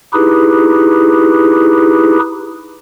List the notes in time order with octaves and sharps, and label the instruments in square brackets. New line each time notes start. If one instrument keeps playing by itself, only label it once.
[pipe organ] D#4 E4 G4 G#4 B4